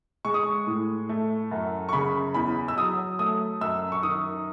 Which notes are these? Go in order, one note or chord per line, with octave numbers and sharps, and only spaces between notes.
G#3 C#6
D#6
C#6
A2
A3
F#2
C#6
C#3 B5
E2 B5
E6
F#3 D#6
A3 D#6
F#2 E6
C#6
D#3 D#6